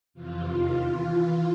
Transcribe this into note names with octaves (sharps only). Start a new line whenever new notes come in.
F2 C3 E3 F4
E2 C3 D#3
E3